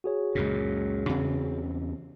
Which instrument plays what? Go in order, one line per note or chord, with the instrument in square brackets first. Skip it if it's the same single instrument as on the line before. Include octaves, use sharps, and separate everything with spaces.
[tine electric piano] F#4 G#4 C#5
[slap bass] C#2 F#2 A#2
E2 C#3 C4